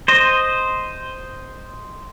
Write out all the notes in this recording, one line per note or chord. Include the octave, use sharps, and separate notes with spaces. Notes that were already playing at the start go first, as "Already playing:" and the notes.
C5 D#5